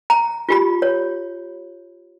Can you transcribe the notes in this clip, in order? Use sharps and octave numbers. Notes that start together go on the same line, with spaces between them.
A#5
F4 G4 B5
C#5